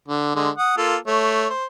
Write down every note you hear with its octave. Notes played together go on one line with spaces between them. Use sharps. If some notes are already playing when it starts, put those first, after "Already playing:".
D3
D3 G#3
F#5 D#6
A#3 F4 A4
A3 C#5
C5